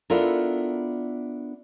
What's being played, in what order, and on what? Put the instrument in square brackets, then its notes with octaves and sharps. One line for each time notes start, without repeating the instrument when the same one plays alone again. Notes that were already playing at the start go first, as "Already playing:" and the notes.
[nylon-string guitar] B3 D4 E4 F4 A4 A#4